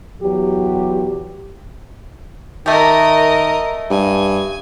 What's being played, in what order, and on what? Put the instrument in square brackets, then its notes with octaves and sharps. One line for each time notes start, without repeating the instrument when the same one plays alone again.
[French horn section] E2 F#3 G4
[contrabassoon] D#3 [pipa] A3 G4 [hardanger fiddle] A#4 D#5
[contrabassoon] G2 [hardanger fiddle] G#5